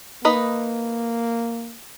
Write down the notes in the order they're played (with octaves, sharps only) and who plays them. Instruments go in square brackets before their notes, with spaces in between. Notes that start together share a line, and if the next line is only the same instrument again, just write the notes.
[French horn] A#3 [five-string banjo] D#4 B4 D#5